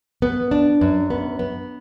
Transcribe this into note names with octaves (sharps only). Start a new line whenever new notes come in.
B3
D4
F#2
B3
B3